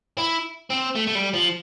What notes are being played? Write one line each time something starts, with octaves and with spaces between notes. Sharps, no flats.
E4
C4
A3
A3
G3
F3